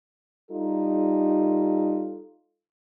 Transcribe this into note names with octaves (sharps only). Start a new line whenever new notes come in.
G3 D#4 F4 A4